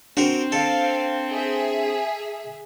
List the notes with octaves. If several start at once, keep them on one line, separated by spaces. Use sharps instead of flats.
C4 D4 F#4 A#4
A4 F5
G#4 E5